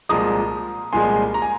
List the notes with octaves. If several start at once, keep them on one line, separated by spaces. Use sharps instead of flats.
C2 A#2 F3 G#3 A#5 D#6
C2 A#2 F3 G#3 G#5 C6
A#5
G#5